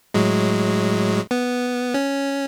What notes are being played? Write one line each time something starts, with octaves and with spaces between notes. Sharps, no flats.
A2 F#3 G#3
B3
C#4